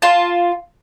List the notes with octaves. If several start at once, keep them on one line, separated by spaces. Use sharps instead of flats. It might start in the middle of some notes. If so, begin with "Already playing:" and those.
F4 A5